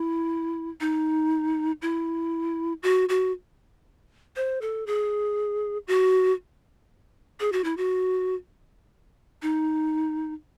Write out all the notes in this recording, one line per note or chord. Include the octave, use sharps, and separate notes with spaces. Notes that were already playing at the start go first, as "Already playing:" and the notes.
Already playing: E4
D#4
E4
F#4
F#4
C5
A4
G#4
F#4
G#4
F#4
E4
F#4
D#4